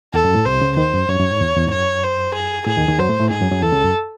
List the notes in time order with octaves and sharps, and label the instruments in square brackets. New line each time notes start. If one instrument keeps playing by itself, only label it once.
[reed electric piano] E2 [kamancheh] A4
[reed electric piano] F#2
A2
[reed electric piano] C2 C3 [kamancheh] C5
[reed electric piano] C#2 C#3
[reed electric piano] D#2 D#3 [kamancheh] C5
[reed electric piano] F#2
[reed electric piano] F#2 [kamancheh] C#5
[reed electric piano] F#2
G#2
E2
E2
G#2
[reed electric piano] F#2 [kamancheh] C#5
[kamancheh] C5
G#4
[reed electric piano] A2 [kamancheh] G#4
[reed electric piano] D#2 D#3
D#2 D#3
[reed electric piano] F#2 F#3 [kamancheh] C5
[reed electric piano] A2 A3
A2 A3
[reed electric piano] G#2 G#3 [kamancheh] G#4
[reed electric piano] F#2 F#3
F#2 F#3
[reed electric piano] E2 E3 [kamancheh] A4
[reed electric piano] C#2 C#3
F#2